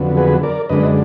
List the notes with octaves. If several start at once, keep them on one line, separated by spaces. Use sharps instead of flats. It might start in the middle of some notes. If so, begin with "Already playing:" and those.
Already playing: F2 D3 F#3 B3
G#4 B4
A#4 D5
F#2 D3 G#3 D4 B4 D#5